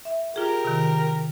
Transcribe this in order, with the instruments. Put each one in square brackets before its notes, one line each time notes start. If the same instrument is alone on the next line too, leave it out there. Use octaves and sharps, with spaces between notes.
[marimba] E5
[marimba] F4 G#4 [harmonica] G4 A#4
[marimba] C3 D#3